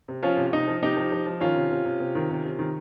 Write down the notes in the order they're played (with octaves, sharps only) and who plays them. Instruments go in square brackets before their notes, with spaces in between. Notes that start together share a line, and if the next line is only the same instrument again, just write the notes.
[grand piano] C3
F3 C#4 F4
C3
C3 D#4
F3
C3 D#4 G4
F3
F3
F3
D#3 C#4 F4
C3
C3
C3
C3
D#3
C3
C3
D#3